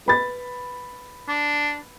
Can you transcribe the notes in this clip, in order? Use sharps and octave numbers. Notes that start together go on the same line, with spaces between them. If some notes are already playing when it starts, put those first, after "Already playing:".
B4 B5 A6
D4